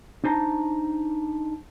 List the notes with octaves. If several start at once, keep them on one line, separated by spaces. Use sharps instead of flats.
D4 D#4 C5 A5 A#5